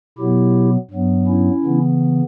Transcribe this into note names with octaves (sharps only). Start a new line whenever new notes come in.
B2 F#3 B3 E4 G4
G2 F#3 B3
C#4 E4
C#3 E3 B3